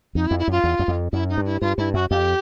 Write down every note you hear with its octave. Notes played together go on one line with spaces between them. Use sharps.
F2 D#4
E4
F2
E4
F#2 F4
E2
F#2
F2
F#2 E4
D#4
G2
E4
G2 F4
G2 E4
F#2 F#4
F2 G4